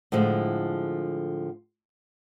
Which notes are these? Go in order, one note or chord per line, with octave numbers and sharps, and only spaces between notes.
A2 D3 F3 G#3